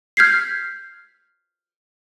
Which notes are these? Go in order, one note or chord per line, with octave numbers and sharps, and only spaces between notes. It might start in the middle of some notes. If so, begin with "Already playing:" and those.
F6 G6 G#6 B6 C7